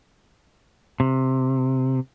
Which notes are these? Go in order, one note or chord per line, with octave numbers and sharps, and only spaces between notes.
C3